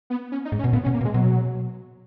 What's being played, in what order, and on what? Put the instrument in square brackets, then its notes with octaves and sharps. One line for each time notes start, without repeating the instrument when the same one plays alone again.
[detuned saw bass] B3
C#4
D#4
[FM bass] G#2
[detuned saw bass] C#4
[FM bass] B2
[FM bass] A#2 [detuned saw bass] B3
[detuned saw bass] C#4
[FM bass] B2
[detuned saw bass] A#3
[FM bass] B2
[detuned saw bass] G#3
[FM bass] B2 [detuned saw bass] F#3